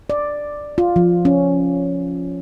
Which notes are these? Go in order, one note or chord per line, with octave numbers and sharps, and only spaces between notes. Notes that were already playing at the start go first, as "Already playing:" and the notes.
D5
F4
F3
C#4